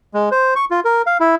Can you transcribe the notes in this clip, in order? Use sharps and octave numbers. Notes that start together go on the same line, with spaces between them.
G#3
C5
C#6
F4
A#4
F5
E4